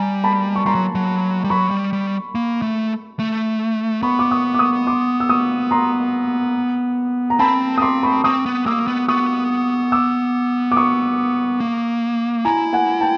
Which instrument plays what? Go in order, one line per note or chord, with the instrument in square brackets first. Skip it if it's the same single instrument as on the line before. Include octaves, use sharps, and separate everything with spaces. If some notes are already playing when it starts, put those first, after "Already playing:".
Already playing: [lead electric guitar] G3 [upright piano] G#5 A#5
[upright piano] A5 B5
C#6
[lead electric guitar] G3 [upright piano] A#5 C6
[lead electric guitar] F#3
F#3
G3
[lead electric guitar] F#3 [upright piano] B5 C#6
[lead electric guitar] G3
G3
A#3
A3
A3
[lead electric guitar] B3 [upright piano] B5 C#6
[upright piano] D6
C#6 D#6
D6
C#6 D#6
C6 D6
E6
C#6 D#6
A#5 C6
A#5
[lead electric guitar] C4 [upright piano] A5 B5
[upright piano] D#6
C6 D6
B5 C#6
[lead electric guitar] C4 [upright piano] C#6 D#6
[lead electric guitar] B3
[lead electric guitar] A#3 [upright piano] D6 E6
[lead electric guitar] B3
[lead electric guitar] B3 [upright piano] C#6 D#6
[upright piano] D6 E6
D6
C#6 D#6
[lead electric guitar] A#3
[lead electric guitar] E4 [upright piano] G#5 A#5
[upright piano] F#5 G#5
G5 A5